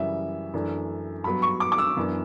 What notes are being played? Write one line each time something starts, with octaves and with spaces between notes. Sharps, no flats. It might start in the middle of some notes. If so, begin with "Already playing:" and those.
Already playing: F#2 C#3 E3 G3 E5
F#2 E3 A3 D4
G2 F#3 B3 B5
C#6
D6
D6
E6
F#2 E3 B3 D4